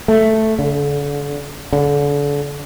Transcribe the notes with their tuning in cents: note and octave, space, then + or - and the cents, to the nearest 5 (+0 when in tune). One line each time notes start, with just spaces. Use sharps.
A3 +0
D3 -35
D3 -35